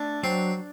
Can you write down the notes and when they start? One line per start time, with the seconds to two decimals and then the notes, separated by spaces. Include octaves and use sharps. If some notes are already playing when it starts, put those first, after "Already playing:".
Already playing: A3 D4
0.23 F#3 C4